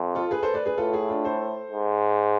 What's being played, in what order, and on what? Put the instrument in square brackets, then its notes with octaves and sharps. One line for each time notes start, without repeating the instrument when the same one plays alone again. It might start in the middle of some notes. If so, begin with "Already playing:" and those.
Already playing: [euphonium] F2
[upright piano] F4 A4
G#4 B4
A4 C5
B4 D5
G#4 B4
[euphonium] A2 [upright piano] F4 A4
[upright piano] E4 G#4
D4 F4
A4 C5
[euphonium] G#2